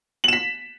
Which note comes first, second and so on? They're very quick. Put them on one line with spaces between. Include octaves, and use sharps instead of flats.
F#7 E7 B6